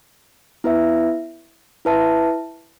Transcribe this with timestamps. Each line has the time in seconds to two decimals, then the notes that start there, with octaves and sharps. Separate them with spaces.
0.64 B3 E4 B4 E5
1.85 E4 B4 E5 A5